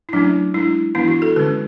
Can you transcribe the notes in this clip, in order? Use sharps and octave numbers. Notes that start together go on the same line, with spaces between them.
E4
F#3 A3 C#4 D4
G#3 D4 E4
E3 B3 D4 E4
F#4
A4
D3 G#3 C#4 B4